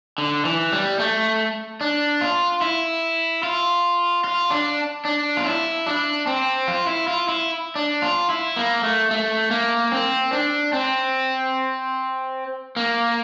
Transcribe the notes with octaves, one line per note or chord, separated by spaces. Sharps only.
D3
E3
G3
A3
D4
F4
E4
F4
F4
D4
D4
F4
E4
D4
C4
F4
E4
F4
E4
D4
F4
E4
A#3
A3
A3
A#3
C4
D4
C4
A#3